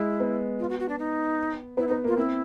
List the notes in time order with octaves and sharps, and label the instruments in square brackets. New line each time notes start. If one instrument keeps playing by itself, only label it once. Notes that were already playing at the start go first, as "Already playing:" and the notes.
Already playing: [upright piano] G#3 [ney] E4
[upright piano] B3
[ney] F4
F#4
F#4
D4
D#4
[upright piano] B3 [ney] E4
[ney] D#4
[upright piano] B3
[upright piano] A#3 [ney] F4
[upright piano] C4 [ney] E4